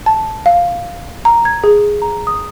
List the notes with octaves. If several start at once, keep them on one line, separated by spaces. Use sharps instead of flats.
A5
F5
A#5
G#6
G#4
A#5
D#6